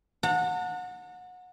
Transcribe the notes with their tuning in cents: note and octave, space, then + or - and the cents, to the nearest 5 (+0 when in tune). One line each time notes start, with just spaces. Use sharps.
F#5 -25 A5 +45